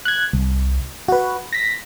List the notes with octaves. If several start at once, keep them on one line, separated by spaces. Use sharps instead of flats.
F#6 G#6
C2
F#4 B4
A#6 B6